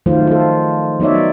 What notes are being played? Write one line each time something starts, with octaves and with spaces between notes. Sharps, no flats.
D#3 F3 F#3 A3 F4 C5
F4 A4
F#3 B3 D#4 C#5 D5 E5